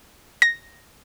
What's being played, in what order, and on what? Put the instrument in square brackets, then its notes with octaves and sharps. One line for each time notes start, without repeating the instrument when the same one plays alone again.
[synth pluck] A#6